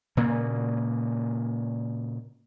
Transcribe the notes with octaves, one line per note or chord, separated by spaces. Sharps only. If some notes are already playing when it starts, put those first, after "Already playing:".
A#2 C#3 A#3